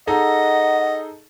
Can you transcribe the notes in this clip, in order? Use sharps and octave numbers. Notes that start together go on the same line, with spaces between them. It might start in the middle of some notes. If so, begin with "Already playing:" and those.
D#4 G#4 A4 D#5 F#5